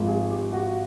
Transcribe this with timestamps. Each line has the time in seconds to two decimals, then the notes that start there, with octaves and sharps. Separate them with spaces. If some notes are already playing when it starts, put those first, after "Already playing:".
Already playing: G#1 G#2 F3 G#3
0.08 G#4
0.30 G4
0.53 F#4